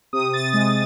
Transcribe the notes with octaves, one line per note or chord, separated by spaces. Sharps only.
C3 D#6
A6
G#3 A6